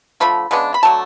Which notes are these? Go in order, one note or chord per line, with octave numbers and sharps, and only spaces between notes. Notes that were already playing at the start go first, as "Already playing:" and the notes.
D3 F3 A3 B5
C#3 G#3 B3 D4
B5
D3 F#3 A3 A5